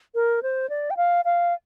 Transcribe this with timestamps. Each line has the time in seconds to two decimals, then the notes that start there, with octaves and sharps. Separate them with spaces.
0.15 A#4
0.43 C5
0.70 D5
0.91 G5
0.97 F5
1.25 F5